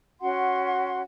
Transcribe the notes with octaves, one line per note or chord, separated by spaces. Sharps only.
C#4 F#4 F#5 C6